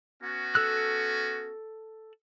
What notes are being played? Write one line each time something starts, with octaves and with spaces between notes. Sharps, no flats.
B3 C#4 F#4
A4 E6 F#6